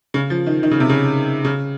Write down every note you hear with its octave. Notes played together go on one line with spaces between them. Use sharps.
C#3
F3
D#3
D#3
C#3
C3
C#3
C#3